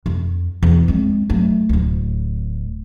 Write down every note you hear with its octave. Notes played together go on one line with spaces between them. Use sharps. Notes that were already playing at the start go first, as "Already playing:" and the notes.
F2
E2
G#3 C4
F#3 A3
D1 D2